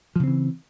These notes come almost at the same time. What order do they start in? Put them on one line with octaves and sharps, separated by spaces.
F3 C#3 C4 E3